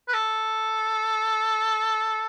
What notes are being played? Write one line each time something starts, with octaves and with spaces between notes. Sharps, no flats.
B4
A4